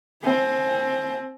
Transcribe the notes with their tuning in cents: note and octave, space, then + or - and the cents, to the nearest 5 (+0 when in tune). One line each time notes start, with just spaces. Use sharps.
C4 +15 G#5 +45